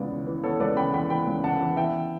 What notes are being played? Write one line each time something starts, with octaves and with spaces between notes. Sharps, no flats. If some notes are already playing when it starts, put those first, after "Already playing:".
Already playing: C#2 C#3 E3 B3 D5
C#3
E3
B3 A4 C#5
C#2 B4 D5
C#3 G5 B5
E3 G5 B5
B3 G5 B5
C#2
C#3 F#5 A5
E3
B3 E5 G5